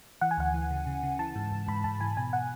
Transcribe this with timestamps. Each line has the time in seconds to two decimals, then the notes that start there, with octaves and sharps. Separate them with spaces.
0.21 E3 F#5
0.31 G#5
0.38 D2 F#5
0.54 E3
0.71 C#3
0.87 C#3
1.03 C#3
1.19 E3 A5
1.35 G#2
1.52 G#2
1.68 G#2 B5
1.84 G#2 A5
2.00 E3 G#5
2.17 B2 G#5
2.33 F#5